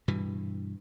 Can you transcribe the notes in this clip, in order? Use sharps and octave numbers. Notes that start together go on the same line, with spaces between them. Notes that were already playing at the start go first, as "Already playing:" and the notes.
G2 B2 E3